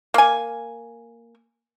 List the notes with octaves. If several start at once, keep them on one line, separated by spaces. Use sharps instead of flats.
A#3 G#5